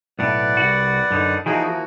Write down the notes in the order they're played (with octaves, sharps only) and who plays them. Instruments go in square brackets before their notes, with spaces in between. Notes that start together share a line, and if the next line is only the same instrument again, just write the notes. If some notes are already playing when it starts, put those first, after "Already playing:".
[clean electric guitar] B1 A2 [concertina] B4 D5 F#5
[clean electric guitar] C2 F#4
F#2 D3 D#4
[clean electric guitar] E3 F3 A#3 [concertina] D#4 F#4 G#4
[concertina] F#4